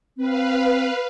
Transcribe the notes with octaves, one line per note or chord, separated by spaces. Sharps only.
C4 B4 F5